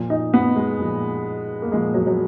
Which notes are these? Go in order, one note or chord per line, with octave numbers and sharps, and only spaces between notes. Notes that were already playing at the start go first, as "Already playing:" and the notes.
Already playing: A#2 F3
D#4
B3
G#3
A#2 F3
A#3
A#2 F3 G#3
F#3
F#3